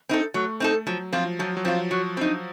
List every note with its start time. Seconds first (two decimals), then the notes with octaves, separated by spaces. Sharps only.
0.09 C4 D#4 A4
0.34 F#3 A3
0.60 C4 D#4 A4
0.87 F3 F#3
1.13 F3 C4 F4
1.39 F3 F#3
1.57 F#3
1.65 F3 C4 F4
1.91 F#3
2.17 C4 D#4